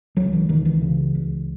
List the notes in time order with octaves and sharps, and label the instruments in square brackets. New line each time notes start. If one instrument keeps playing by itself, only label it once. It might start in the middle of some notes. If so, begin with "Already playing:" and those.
[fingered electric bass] C#2 F#3
E3
C#2 D#3
E3
C#3
C#2